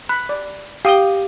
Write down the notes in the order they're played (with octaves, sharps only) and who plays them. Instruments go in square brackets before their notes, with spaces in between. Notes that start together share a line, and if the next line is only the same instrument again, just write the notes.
[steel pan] B5 [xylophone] F#6
[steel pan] D5
[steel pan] G4 D#6 [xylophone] F5 G5 G7